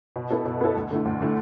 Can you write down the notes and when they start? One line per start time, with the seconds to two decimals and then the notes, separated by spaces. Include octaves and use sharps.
0.16 B2
0.31 B3 E4 A4
0.45 B2
0.61 B3 E4 A4
0.76 D2
0.91 D3 A3 E4
1.05 D2
1.20 D3 A3 E4